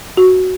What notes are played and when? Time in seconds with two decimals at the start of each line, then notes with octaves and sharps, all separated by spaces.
0.17 F#4